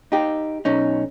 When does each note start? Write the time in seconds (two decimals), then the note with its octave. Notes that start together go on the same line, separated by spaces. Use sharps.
0.12 D#4 G4
0.65 B1 C#4 D#4